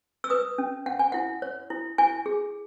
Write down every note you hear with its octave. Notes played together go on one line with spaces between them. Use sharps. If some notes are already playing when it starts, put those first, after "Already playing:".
E6
B4 D#6
C#4
C#4 F#5
G#5
E4 F#5
C#5
E4
E4 G#5
G#4